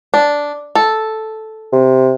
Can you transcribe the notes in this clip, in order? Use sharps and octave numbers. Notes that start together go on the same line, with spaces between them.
D4
A4
C3